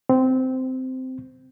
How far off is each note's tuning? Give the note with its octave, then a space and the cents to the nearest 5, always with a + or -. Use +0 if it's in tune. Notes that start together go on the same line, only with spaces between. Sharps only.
C4 -15